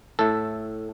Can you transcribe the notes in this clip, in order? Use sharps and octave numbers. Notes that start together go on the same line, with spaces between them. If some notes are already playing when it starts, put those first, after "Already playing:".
A2 A3 A4